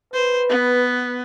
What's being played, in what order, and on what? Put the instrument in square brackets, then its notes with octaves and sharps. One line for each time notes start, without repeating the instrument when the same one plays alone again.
[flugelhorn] B4 [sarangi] C5
[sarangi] B3